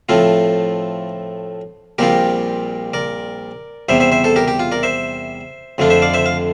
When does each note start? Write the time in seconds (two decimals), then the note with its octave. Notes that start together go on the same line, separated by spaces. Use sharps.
0.09 A2 F3 A3 C4 F4
1.98 A#1 A#2 G3 C4 F4 G4 A#4
2.94 A#4 D5
3.89 E2 C3 G3 C5 E5
4.00 C5 E5
4.12 C5 E5
4.24 A4 C5
4.36 G4 A#4
4.48 G4
4.60 F4
4.72 A#4 D5
4.83 C5 E5
5.78 F2 D3 A3 D4 F4
5.90 C5 E5
6.02 D5 F5
6.14 C5 E5
6.26 F5